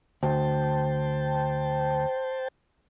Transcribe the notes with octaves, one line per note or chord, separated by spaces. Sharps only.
D2 C5 G5 A5